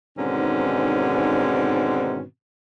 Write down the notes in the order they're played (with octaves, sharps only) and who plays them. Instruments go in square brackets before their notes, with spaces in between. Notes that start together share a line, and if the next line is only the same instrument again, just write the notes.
[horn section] G#2 B2 D3 D#3 C4 C#4